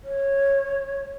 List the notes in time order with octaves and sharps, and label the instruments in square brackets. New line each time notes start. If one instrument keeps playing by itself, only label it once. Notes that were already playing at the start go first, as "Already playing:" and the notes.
[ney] C#5